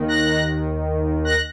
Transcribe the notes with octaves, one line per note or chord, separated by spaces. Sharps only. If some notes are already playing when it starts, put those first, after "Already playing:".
Already playing: D#2 D#3
F#6 A#6
F#6 A#6